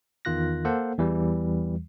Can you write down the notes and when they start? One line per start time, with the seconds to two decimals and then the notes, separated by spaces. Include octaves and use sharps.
0.25 E2 D#3 F4 F#6 A#6
0.65 A#3 A4 C5 F#5
0.98 E2 E3 G3